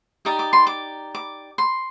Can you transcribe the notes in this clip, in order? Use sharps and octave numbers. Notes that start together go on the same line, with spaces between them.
D#4 G4 D5 D#6
D6
C6
D6
D6
C6